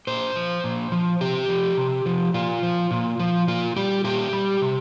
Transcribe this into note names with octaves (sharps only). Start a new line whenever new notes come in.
A#2 C5
F3
A#2
F3
C3 G4
F3
C3
F3
A#2 F4
F3
A#2
F3
A#2 F4
G3 G4
A#2 G4
G3
C3